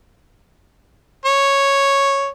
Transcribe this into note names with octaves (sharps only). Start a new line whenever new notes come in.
C#5